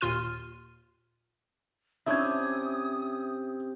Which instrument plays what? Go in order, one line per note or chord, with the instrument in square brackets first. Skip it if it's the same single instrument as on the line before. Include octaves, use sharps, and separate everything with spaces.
[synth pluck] D#2 A#2 F4 C6 F6 D#7
[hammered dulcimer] C3 [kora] C#4 D4 E4 [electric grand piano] E5 G#6 [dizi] D#6